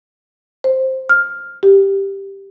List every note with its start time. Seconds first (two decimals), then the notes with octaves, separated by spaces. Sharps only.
0.64 C5
1.09 F6
1.63 G4